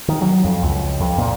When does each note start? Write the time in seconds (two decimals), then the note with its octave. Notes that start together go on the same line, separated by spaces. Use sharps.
0.09 D#3
0.21 F#3
0.44 F2
0.63 C#2
1.00 F2
1.18 A#2